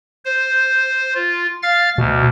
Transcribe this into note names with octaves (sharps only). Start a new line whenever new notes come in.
C5
F4
F5 F6 A6
D2 B2